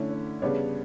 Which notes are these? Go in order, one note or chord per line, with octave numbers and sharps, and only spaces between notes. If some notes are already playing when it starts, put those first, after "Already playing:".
Already playing: D3 A3 C#4 E4
C#5
C#3 G3 B3 D4 C#5